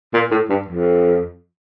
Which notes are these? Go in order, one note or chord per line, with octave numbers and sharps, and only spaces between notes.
A#2
A2
G2
F2